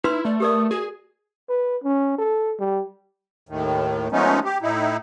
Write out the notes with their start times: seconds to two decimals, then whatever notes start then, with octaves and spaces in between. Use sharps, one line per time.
0.04 D#4 E4 B4 C6
0.25 A3 D5
0.40 G4 A#4 D5 D#6
0.71 F#4 G#4
1.50 B4
1.84 C#4
2.18 A4
2.59 G3
3.49 D#2 A2 D#3
4.12 F3 G#3 A3 B3 C#4 D#4
4.44 G4
4.62 A2 D#4 E4